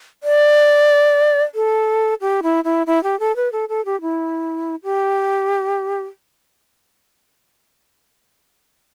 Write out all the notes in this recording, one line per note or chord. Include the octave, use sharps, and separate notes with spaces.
D5
A4
G4
E4
E4
E4
G4
A4
B4
A4
A4
G4
E4
G4